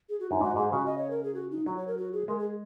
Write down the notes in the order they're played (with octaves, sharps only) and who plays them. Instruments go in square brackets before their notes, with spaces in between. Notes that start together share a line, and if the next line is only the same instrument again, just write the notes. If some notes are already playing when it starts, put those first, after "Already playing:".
[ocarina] G#4
F#4
[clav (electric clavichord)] F#2 [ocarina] D#4
[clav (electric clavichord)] G#2 [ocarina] F#4
[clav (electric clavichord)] G#2 [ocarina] G#4
[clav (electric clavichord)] C#3 [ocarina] F#4
[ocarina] D#5
C#5
A#4
G#4
F#4
D#4
[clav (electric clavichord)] F#3 [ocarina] F#4
[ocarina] C#5
A#4
F#4
G#4
[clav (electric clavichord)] G#3 [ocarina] A#4
[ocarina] G#4